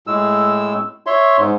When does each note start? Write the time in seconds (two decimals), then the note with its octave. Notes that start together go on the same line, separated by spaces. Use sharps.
0.07 A2 G#3 E6
1.06 C#5 E5 C6
1.38 G#2